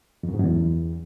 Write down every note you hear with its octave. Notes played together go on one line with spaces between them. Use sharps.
F2
F#2
G#2
F#2
E2